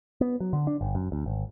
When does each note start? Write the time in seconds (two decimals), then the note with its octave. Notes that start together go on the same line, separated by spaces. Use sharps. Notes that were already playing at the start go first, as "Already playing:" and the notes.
0.21 B3
0.40 F#3
0.53 D3
0.67 D4
0.81 G1
0.95 F#2
1.12 D2
1.26 G#1